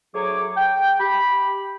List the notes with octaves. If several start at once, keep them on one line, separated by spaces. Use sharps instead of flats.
D2 F#3 G#4 C#5 D6
G5
G4 B5